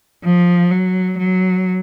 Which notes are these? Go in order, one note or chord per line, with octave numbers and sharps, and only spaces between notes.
F3
F#3
F#3